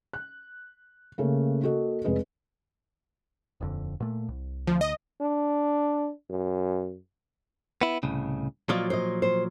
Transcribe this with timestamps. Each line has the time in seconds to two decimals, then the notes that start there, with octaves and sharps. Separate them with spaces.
0.13 F#6
1.18 C#3 A3 A#3
1.62 A#3 F#4 A4 D#5
2.04 F1 G#3 G#4 B4 D#5
3.61 D#1 F2 D3
4.00 A#2 A3
4.28 C2
4.67 D2 F3
4.81 D#5
5.21 D4
6.30 F#2
7.81 B3 E4
8.03 C2 A2 C#3
8.69 A#2 F3 F#3 F4 D5 D#5
8.90 C5 D#5
9.22 C5